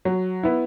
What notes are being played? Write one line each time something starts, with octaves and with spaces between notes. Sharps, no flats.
F#3
B3 E4